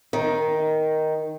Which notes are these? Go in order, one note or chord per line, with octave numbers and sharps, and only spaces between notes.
D#3